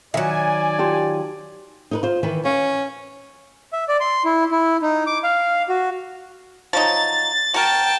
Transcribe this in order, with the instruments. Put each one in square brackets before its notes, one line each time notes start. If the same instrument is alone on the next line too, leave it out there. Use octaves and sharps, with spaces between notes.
[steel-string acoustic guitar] D#3 F#3 [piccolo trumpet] D5 [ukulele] E5 [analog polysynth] G#5
[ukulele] F4 G4 A5
[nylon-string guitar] D#4 A#4 B4
F4 C5
D#3 E3 B4
[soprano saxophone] C#4 [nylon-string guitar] F5
[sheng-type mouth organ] E5
D5
C6
E4
E4
D#4
D6
F5
F#4
[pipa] F3 F#3 D#4 [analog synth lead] A6
[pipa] F#4 A#4 [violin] G5 A5